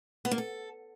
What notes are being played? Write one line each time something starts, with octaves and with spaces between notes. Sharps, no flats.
B3
A#3
A4